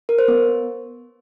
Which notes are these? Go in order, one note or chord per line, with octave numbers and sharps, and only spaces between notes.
A#4
C5
B3